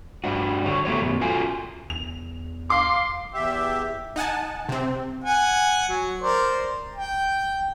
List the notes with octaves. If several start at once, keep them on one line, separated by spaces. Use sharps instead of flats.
G2 G3 D4 F#4
D3 F#4 C#5
F#3 A3 B3 G4 C#5
F#2 B2
F4 F#4 A4 G#5
E2 F7
F5 C6 D6
E2 G4 E5
D#4 F#5 G#5 A5
C3 C4
F#5 G#5
F#3
A#4 C5 D5
G5